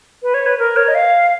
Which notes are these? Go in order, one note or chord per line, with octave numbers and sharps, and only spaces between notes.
B4
C#5
B4
A#4
C#5
D#5
F5